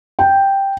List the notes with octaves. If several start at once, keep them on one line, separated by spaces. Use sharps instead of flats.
G5